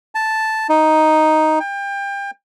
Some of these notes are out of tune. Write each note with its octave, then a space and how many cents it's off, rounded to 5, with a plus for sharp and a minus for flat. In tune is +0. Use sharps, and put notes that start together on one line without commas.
A5 +0
D#4 +5
G5 +30